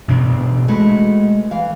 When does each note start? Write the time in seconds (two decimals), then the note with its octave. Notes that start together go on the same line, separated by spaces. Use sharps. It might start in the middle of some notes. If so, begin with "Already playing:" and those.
0.08 A1 B2 D4
0.68 G#3 A3 F#4 B4
1.51 E3 F5